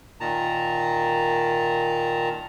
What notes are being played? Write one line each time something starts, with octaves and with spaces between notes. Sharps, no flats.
A#2 D#3 A5 A#5